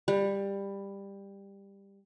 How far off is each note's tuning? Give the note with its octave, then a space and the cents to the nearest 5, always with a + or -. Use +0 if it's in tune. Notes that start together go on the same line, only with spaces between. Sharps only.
G3 +15